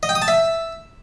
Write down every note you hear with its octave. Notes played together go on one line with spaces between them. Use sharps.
D#5
G5
D#6
A5
E5